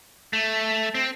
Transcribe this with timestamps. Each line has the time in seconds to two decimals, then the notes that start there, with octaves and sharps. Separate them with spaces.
0.33 A3
0.95 C4